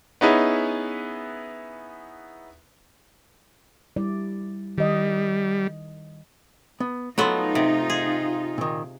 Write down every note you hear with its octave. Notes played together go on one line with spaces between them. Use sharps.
B3 C#4 D#4 E4 G#4 B4
G3 E4 D5
D#3 G3 D#5
B3
F#3 A3 B3 D#4 F4 A4 C6
C3
G#4
A#2 D#3